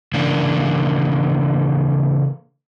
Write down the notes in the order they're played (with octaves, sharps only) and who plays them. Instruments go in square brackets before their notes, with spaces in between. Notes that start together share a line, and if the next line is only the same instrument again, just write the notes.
[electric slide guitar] C#3 E3 A#3 D4